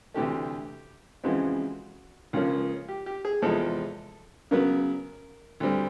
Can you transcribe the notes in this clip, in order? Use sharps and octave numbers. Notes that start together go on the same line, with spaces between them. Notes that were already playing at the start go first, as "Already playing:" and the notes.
D2 C3 E3 A3 G4
F2 C#3 E3 G#3 C4 F#4
C#2 C#3 F3 A#3 C#4
G4
G4
G#4
E2 C3 F3 G#3 C4 A4
C#3 F#3 B3 A#4
D2 D3 G3 C4